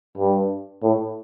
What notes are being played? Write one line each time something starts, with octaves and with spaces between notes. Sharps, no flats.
G2
A2